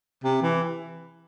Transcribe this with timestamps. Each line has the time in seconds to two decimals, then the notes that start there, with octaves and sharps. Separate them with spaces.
0.24 C3
0.42 E3